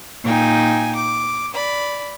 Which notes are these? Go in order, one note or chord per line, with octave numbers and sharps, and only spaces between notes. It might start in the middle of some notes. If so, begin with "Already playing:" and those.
A#2 D#4 G5 G#5
D6
D5 B5